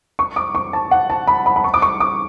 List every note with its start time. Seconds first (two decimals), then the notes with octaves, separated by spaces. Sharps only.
0.19 C#6
0.36 D6
0.55 C#6
0.73 A5
0.91 F#5
1.10 A5
1.27 B5
1.46 B5
1.56 B5
1.64 C#6
1.74 D6
1.82 C#6
2.00 D6